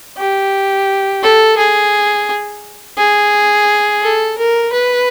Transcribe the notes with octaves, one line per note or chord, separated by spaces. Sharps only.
G4
A4
G#4
G#4
A4
A#4
B4